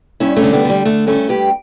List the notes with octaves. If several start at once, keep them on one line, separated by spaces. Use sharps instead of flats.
G2 C#4 E4
A3 C#4
D3
G3 B3
D3 G3
D3 A3
G2 A3 C#4
G2 G4 B4